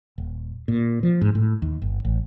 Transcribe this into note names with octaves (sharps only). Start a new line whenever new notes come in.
D#1
A#2
F3
G#2
A2
D#2
G1
A1